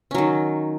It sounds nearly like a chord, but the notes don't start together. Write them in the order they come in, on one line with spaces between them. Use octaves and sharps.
C#4 F#3 D#3